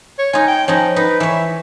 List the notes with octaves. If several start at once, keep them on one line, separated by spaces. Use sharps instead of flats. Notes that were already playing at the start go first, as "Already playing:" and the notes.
C#5
D#4 F4 G#5
G5
F3 C#4 D#4
D#4 B4
E3 C#5 E5